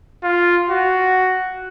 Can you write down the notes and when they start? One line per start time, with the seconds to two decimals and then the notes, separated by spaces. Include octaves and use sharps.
0.24 F4
0.70 F#4